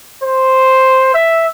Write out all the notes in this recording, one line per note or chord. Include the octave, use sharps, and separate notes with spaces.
C5
E5